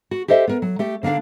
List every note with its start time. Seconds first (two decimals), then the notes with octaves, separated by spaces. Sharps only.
0.11 F#4
0.28 G4 A4 C5 D#5 E5
0.48 B3 A#4
0.62 F#3
0.79 A3 G4
1.03 D3 A#3 C4 D4 F5